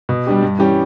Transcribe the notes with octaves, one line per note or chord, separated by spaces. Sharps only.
B2
G3 D4 G4
G2
E3 G3 C#4 G4